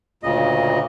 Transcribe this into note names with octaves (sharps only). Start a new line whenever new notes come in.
D2 A#2 C#3 D#5